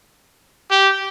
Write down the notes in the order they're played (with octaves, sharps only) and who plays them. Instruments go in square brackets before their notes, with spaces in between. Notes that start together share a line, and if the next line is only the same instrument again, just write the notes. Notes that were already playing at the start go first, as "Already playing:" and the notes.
[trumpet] G4